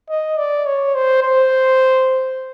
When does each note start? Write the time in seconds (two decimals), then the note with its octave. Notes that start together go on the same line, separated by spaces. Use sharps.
0.10 D#5
0.38 D5
0.66 C#5
0.95 C5
1.23 C5